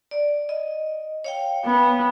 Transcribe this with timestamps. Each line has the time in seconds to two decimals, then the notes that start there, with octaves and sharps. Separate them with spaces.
0.11 D5
0.49 D#5
1.24 C#5 F5 G5
1.65 B3